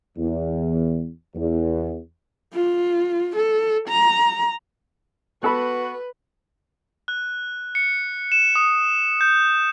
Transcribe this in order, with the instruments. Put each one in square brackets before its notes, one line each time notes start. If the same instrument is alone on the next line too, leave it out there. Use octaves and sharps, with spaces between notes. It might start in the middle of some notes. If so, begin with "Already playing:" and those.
[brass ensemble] E2
E2
[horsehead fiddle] F4
A4
A#5
[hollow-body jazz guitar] B3 B5 [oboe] F#4 [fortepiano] A4 F#6 [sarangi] B4
[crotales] F#6
C#7
E7
D#6
G6